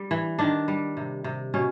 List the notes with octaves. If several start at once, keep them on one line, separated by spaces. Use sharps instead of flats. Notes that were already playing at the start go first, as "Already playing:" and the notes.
Already playing: G3
E3
D#3 D4
G3
C3
C3
B2 C#4